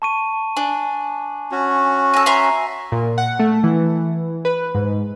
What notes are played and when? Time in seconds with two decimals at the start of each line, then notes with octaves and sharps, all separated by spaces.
0.02 A5 C#6 D#7
0.57 D4 G#5
1.51 C#4 F#4
2.14 A4 C#5 G#5 A#6 D#7
2.26 E5 A#5 C6
2.92 A#2
3.18 F#5
3.40 A3
3.64 E3
4.45 B4
4.75 G#2